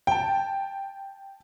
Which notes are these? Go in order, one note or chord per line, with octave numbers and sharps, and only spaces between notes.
G5 A5